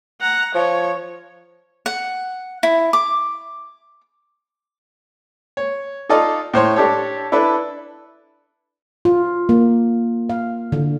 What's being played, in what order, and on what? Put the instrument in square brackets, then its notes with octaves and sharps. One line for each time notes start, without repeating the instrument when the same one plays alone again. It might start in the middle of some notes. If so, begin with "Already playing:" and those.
[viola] F#5 A#5
[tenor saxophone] F3 [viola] C#5
[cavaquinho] F#5
E4
D6
[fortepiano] C#5
D#4 F4 A4 D5 D#5 F5
A2 C5 C#5 C6
D4 G4 A4 C#5
D4 E4 A4 B4
[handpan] F4
A#3
F5
D3